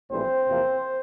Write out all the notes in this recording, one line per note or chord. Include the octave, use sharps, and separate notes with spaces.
A#1 A2 E3 G3 C4 C5
E2 C3 F3 A#3